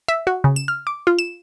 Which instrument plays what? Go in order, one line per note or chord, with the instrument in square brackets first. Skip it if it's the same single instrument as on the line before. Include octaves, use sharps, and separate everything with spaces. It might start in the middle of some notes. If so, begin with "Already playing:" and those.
[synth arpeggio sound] E5
F#4
C#3
E7
F6
D6
F4
E7